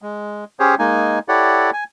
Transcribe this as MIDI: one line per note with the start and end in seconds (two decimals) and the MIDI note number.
0.02 0.44 56
0.60 0.75 61
0.60 0.75 67
0.60 0.75 68
0.60 0.75 72
0.60 0.75 73
0.79 1.19 56
0.79 1.19 58
0.79 1.19 63
0.79 1.19 80
1.28 1.70 64
1.28 1.70 67
1.28 1.70 69
1.28 1.70 73
1.28 1.70 74
1.28 1.70 78
1.73 1.84 80